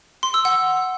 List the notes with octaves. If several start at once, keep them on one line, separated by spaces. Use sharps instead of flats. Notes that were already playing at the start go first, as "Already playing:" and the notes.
C6
E6
F#5